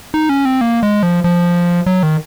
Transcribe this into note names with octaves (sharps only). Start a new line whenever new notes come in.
D#4
C#4
C4
A#3
G#3
F3
F3
F#3
D#3